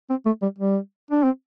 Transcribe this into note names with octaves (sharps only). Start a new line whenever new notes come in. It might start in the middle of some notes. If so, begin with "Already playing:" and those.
C4
A3
G3
G3
D4
C4